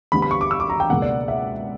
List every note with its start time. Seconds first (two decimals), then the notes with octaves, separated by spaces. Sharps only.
0.12 D2 D3 G3 B3 B5
0.22 B5
0.31 C#6
0.41 D6
0.51 E6
0.60 D6
0.70 A#5
0.80 G5
0.89 C#2 B2 A#3 F#5
1.02 D5
1.28 E5